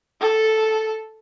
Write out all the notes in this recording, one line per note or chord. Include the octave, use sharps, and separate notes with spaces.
A4